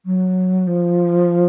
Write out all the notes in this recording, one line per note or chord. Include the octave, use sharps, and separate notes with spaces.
F#3
F3